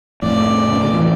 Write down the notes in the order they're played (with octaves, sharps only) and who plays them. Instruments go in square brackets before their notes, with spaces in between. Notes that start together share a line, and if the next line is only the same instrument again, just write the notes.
[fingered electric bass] F2 A2 [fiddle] D5
[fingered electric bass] C#3
D3
E3